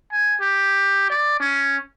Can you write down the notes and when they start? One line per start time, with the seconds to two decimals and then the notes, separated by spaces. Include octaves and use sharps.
0.12 G#5
0.41 G4
1.10 D5
1.40 C#4